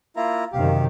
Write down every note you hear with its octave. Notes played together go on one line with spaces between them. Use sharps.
A#3 E4 F4 A#5
F#2 C3 D#3 G4 F5